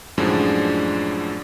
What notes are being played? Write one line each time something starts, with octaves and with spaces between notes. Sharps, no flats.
F#2 A2 D3 F3 G#3 D4